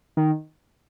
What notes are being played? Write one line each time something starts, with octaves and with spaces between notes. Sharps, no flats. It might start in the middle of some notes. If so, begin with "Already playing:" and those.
D#3